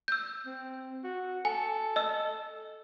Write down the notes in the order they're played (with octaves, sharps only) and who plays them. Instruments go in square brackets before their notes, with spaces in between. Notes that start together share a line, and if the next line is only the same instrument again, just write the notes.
[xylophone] E6 G6
[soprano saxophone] C4
F#4
[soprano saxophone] A4 [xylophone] G#5
[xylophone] D#5 E6